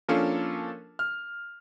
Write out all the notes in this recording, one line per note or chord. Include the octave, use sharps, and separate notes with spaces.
F3 A#3 C#4 D4 F4 A4
F6